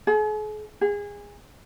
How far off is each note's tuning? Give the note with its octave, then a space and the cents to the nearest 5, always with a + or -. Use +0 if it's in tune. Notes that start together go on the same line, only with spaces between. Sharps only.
G#4 +45
G#4 -25